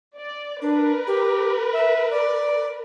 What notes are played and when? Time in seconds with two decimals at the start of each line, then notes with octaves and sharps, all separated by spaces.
0.17 D5
0.62 D4 A#4 B4
1.07 G4
1.73 E5
2.11 D5